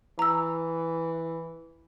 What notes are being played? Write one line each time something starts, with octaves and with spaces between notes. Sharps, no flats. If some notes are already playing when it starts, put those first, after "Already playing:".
E3 A#5 E6